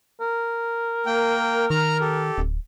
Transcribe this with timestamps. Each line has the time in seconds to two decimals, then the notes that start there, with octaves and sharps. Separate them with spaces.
0.21 A#4
1.06 A#3 G5
1.70 D#3 A#5 F6
2.00 G4 A4
2.38 D1